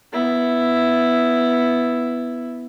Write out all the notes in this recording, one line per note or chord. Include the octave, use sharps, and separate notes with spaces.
B3 E4